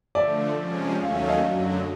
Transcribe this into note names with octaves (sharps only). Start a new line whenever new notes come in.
D3 F3 A3 D5 E5
C3 F3 G#3 C#4
D#2 D#3 F#3 A3 C#4 F5
E5
D#5 F5
F#2 D3 F#3